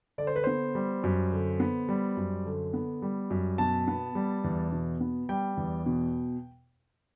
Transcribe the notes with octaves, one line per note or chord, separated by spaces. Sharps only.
D3 D5
C5
B4
B3 C5
G3
F#2
D3
B3
G3
F#2
D3
B3
G3
F#2
B2 A5
B3
G3
E2
B2
B3
G3 G5
E2
B2